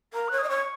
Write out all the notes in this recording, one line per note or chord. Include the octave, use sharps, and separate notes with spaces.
A#4 A#5
C#5 F#6
D#5 D#6
C#5 C#6